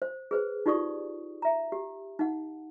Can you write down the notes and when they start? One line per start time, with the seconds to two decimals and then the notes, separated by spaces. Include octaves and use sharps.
0.02 C5
0.31 G#4 B4 C5
0.66 D#4 F4 G4 D5 C#6 D#6
1.42 E5 A#5
1.72 G4
2.19 D#4 F#5